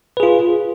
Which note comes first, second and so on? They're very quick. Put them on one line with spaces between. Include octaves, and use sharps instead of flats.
B4 G#4 F4